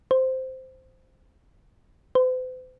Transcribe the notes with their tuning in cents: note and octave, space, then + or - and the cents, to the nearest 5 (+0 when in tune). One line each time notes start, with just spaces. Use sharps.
C5 -5
C5 -45